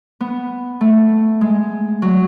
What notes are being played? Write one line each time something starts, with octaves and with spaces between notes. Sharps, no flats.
B3
A3
G#3
F#3